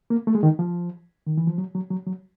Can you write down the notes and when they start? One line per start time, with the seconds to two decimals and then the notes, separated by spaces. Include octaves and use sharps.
0.10 A#3
0.27 A3
0.35 G#3
0.43 D#3
0.59 F3
1.27 D#3
1.37 E3
1.47 F3
1.58 F#3
1.75 F#3
1.90 F#3
2.07 F#3